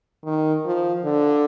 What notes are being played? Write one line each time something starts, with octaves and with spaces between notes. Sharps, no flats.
D#3
F3
D3